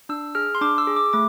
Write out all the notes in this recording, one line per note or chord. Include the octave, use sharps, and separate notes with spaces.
D4 E6
G#4 F6
C6
D4 D6
E6
G#4
D6
A3 D6